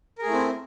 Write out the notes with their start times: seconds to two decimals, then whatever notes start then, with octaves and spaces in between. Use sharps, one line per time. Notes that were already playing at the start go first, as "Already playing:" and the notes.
0.18 A#4
0.22 G#4
0.26 A3
0.30 E4
0.34 C4